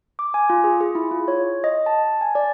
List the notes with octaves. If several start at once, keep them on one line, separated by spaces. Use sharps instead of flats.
D6
G#5
F4
G#4
G#4
E4
F4
C#5
D#5
A5
G#5
D5